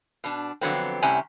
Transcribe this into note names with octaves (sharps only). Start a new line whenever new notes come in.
B2 D4
F2 D3 F#3 B3 C4
A2 C3 G3 C#4 G#5